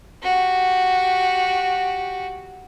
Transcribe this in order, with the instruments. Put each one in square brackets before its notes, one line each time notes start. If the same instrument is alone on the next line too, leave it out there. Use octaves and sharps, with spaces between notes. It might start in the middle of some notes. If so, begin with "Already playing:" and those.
[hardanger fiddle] F#4 G4